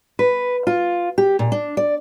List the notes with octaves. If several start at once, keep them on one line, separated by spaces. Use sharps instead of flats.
B4
F4
G4
A#2
D4
D5